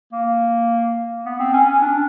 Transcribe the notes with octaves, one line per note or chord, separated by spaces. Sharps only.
A#3
B3
C4
C#4
C#4
D4